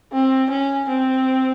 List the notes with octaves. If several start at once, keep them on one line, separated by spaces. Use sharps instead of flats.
C4
C#4
C4